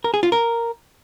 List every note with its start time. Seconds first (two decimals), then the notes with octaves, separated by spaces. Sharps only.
0.04 A#4
0.14 G#4
0.23 F4
0.32 A#4